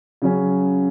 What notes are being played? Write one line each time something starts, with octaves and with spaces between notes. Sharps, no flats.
C#3 F#3 C#4